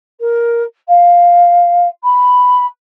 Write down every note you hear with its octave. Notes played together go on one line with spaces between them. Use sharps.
A#4
F5
B5